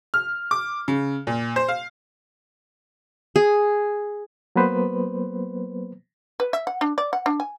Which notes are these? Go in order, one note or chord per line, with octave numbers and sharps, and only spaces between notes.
F6
D6
C#3
A#2
C5
F5
G#4
F#3 A#3 B3 B4 C5
B4
E5
F#5
D4
D5
F#5
D4
G#5